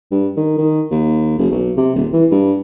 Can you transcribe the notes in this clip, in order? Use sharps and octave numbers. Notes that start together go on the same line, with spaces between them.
G2
D#3
D#3
D#2
F#1
B1
C3
D#1
E3
G2